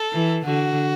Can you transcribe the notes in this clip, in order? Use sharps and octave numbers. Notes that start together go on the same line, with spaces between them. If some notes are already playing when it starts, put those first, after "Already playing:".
Already playing: A4
E3
D3 F#4